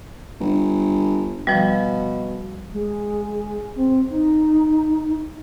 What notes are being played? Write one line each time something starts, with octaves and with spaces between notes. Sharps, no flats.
G1
B2 F3 G3
G#3
C4
D#4